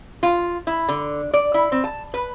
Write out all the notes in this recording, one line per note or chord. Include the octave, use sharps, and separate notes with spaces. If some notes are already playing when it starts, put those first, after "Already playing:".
F4
E4
D3
D5
E4
C4
A5
B4